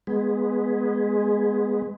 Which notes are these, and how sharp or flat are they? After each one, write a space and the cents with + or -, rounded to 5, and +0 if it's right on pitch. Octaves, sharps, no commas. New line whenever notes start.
G#3 +0 B3 +0